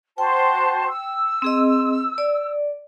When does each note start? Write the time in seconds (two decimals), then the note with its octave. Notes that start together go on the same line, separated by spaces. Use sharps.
0.18 F#4 C5 G5 A5
0.88 E6
1.42 C4 G#4 D#5
2.18 D5